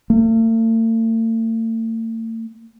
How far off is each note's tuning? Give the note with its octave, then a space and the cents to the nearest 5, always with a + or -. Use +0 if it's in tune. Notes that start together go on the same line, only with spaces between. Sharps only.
A3 +45